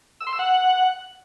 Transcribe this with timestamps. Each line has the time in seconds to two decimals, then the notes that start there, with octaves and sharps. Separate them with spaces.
0.21 E6
0.27 C6
0.33 E6
0.39 F#5